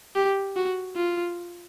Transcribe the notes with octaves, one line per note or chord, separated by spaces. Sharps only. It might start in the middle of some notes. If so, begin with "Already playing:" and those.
G4
F#4
F4